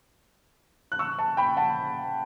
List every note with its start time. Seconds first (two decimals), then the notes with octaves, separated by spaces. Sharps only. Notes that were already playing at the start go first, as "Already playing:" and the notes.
0.92 F#6
0.99 C#6 E6
1.18 A5 C#6
1.37 G5 B5
1.57 F#5 A5